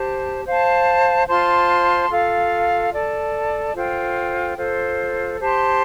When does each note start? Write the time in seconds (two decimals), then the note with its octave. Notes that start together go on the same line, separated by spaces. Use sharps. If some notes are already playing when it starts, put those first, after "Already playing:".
Already playing: G4 C5 A5
0.45 C5 F5 A5
1.27 F4 C5 A5 C6
2.10 F4 A4 F5
2.93 A4 D5 A5
3.75 F4 A4 C5 G5
4.57 F4 A4 C5
5.40 G4 C5 A5 C6